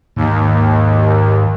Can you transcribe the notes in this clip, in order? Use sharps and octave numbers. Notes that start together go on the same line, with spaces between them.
D#2 G#2 D#3